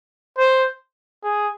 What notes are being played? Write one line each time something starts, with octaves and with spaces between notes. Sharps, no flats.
C5
G#4